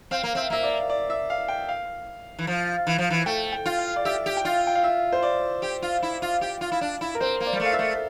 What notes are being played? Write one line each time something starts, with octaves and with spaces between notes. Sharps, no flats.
C4 F5
A#3
C4 E5
A#3 E5
D5
D5
E5
F5
G5
F5
E3
F3
E3
F3
E3
A3 G5
G5
F4
F5
D5
G4 E5
G4
G5
F4 F5
G5
F5
E5
C5
D5
G4
F4
E4
F4
G4
F4
E4
D4
E4
A#4
C4 C5
A#3
D5
G3
A3
F5
E5
A3